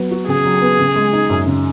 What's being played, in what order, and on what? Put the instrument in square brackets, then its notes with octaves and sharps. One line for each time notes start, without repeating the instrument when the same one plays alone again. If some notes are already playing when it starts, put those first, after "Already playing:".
Already playing: [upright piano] F#3 B3
F#4
[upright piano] C#3 [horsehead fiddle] G#4
[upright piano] F#3
B3
C#3
G#3
D#4
F#2
C#3